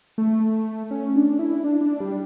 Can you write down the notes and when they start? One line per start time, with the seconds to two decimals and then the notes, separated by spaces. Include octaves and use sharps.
0.18 A3
0.91 C#4
1.16 D4
1.39 E4
1.64 D4
1.81 D4
2.00 G3